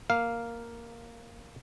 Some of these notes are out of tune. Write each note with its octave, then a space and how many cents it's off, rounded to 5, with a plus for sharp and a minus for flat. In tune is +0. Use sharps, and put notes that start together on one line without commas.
A#3 +0 F5 +0